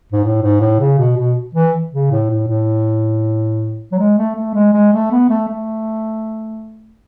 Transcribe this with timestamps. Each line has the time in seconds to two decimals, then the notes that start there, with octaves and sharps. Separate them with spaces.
0.12 G#2
0.24 A2
0.42 G#2
0.61 A2
0.80 C#3
0.99 B2
1.17 B2
1.55 E3
1.93 C#3
2.11 A2
2.30 A2
2.48 A2
3.92 F#3
3.99 G#3
4.18 A3
4.36 A3
4.54 G#3
4.73 G#3
4.93 A3
5.11 B3
5.30 A3
5.48 A3